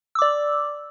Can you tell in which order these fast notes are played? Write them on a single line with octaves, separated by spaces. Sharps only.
E6 D6 D5